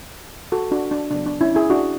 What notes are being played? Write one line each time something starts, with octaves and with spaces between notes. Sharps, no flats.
F#4 A4
D4 F#4
D4
C#3 F#3 B3 D4
D4
C#4 E4
E4 G#4
D4 F#4